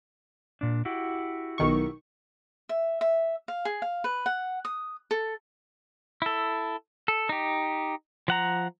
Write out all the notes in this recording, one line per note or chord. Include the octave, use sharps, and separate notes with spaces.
A#2 D4
E4 F#4 G4
B1 D#3 C#6
E5
E5
F5
G#4
F5
B4
F#5
D#6
A4
E4 A4
A4
D#4 G4
F3 F#5 A#5